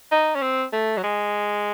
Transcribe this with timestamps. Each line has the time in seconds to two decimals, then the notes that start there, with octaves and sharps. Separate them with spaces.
0.11 D#4
0.35 C#4
0.42 C4
0.72 A3
0.97 F#3
1.03 G#3